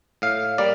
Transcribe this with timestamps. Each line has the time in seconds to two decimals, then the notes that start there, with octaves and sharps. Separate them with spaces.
0.22 A2 F5
0.58 G3 A#3 D5